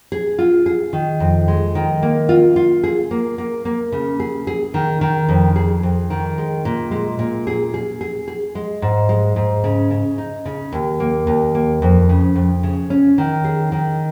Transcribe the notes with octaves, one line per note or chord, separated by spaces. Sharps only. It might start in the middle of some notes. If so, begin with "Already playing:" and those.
G#4
F4
G#4
D#3
F2
G#3
D#3
A#3
F4
F4
G#4
A#3
A#3
A#3
C#3
G#4
G#4
D#3
D#3
F2
G#4
F2
D#3
G#3
A#2
G#3
A#2
G#4
G#4
G#4
G#4
G#3
G#2
G#3
G#2
C#3
C#3
D#4
C#3
D#2
A#3
D#2
A#3
F2
C#3
F2
C#3
C#4
D#3
G#4
D#3